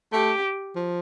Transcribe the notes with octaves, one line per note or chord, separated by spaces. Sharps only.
A3 G4
F3